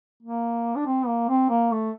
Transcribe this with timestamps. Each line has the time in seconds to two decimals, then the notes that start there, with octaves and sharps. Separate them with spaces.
0.23 A#3
0.76 D4
0.86 C4
1.07 A#3
1.29 C4
1.50 A#3
1.72 A3